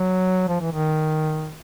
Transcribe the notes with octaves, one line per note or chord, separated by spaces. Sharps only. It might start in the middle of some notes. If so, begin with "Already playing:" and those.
Already playing: F#3
F3
E3
D#3